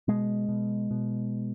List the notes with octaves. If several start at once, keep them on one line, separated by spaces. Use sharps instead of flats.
B2 G#3
B2
B2